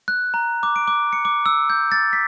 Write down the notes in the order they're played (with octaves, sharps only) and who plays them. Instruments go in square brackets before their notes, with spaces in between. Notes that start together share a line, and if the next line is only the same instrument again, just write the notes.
[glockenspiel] F#6
A#5
D6
D7
D6
C#7
D6
E6
G6
A6
B6